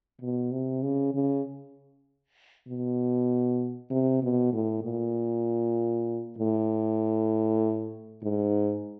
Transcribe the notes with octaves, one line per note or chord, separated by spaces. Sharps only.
B2
C3
C#3
C#3
B2
C3
B2
A2
A#2
A2
G#2